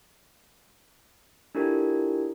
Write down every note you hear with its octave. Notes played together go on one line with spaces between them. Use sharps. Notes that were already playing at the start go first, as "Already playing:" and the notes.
D4 E4 F4 G4 A4 A#4